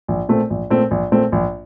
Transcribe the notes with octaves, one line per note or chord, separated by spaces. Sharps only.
A#1
A#2 A3 C4
A#1
A#2 A3 C4
A#1
A#2 A3 C4
A#1